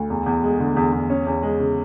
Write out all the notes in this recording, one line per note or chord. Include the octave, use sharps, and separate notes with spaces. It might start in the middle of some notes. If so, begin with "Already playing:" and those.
Already playing: D2
E2
E2
G#3
D3
E2
E2
C#4
E2
G#3
C#3